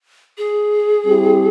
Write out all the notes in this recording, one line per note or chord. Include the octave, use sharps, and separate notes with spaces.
G#4
G3 C4 E4 G4